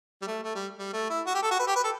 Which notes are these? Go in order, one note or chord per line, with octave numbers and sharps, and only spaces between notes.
G3
A3
A3
G3
G3
A3
E4
F#4
G4
A4
F#4
B4
G4
B4
A4